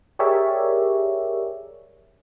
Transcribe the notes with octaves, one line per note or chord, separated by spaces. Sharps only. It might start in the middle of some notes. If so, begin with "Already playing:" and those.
G4 G#4 A#4 C#5 D5 E5